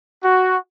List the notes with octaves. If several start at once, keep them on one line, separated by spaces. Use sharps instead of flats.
F#4